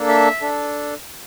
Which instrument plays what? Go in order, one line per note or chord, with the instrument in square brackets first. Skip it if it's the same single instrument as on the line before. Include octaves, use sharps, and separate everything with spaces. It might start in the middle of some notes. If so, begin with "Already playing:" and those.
Already playing: [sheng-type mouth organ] A#3 D4 A4
E5
D4 A4